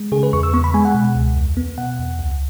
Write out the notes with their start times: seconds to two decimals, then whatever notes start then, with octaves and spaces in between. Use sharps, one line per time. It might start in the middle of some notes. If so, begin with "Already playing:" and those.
Already playing: G#3
0.12 C#3 G#4
0.23 B4
0.33 E2 C#6
0.43 E6
0.54 B3 C#6
0.64 B5
0.74 G#3 G#5
0.85 F#5
0.94 B2
1.15 C#2
1.36 E2
1.57 B3
1.78 B2 F#5
1.99 E2
2.19 C#2